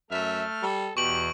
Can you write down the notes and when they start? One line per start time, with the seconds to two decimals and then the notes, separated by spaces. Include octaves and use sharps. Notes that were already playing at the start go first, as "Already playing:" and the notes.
0.11 F#2 A3 E5 F6
0.62 G3 A4
0.97 E2 B2 G4 C#6 D7 F#7